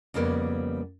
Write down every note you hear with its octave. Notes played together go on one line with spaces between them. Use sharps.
F2 C#3 G3 A#3 B3